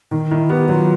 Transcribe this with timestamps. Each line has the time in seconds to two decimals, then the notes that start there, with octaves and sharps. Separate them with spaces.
0.11 D#3 D#4
0.31 D#3 E4
0.49 B3 G4
0.68 F#3 F4